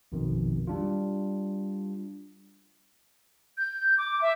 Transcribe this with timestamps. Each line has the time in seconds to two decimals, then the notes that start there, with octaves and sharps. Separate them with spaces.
0.12 A#1 F2 B2 D#3
0.67 G3 D4 F4
3.57 G6
3.98 D6
4.22 E5